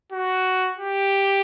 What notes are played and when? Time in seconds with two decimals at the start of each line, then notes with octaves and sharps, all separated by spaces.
0.13 F#4
0.79 G4